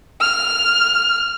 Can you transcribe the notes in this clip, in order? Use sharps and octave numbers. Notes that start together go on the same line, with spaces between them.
F6